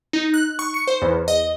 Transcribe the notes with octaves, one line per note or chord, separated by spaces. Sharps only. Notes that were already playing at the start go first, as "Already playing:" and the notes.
D#4
F#6
C#6
C#7
C5
E2
D#5